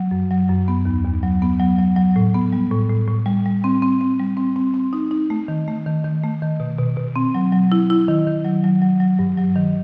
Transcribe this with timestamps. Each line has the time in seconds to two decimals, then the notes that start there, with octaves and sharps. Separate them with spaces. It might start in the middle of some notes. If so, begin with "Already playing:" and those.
Already playing: F#3
0.11 F#2
0.31 F#3
0.49 F#2
0.68 B3
0.85 D#2
1.04 D#2
1.23 F#3
1.42 B3
1.59 F#3
1.79 F#3
1.96 F#3
2.16 A2
2.34 B3
2.53 G3
2.71 A2
2.90 A2
3.08 A2
3.26 G3
3.46 G3
3.64 C4
3.82 C4
4.01 C4
4.20 G3
4.37 C4
4.56 C4
4.74 C4
4.93 D#4
5.11 D#4
5.30 A3
5.48 D#3
5.68 A3
5.86 D#3
6.04 D#3
6.23 A3
6.42 D#3
6.60 B2
6.78 B2
6.97 B2
7.16 C4
7.35 F#3
7.52 F#3
7.72 E4
7.90 E4
8.08 D#3
8.27 D#3
8.45 F#3
8.64 F#3
8.82 F#3
9.00 F#3
9.19 G2
9.38 F#3
9.56 D#3